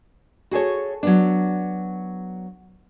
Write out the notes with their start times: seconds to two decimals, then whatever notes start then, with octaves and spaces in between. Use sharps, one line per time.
0.51 F#4 G#4 A4 C#5
1.03 F#3 B3 D4